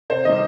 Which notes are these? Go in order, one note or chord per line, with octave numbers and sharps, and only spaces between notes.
C3 C5
D#3 G3 D#5